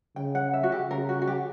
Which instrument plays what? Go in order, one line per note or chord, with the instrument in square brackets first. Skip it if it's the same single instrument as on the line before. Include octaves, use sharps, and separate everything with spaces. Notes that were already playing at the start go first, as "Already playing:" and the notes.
[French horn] C#3 [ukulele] G5
[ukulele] F#5
E5
F#4
G4
[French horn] C#3 [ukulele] A#4
[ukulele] F#4
F#4
G4